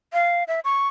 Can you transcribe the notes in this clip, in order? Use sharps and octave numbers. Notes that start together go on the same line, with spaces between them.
F5
E5
C#6